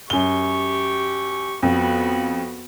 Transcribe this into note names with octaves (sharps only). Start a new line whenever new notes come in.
F#2 G4 C#6 G7
F2 B3 F#4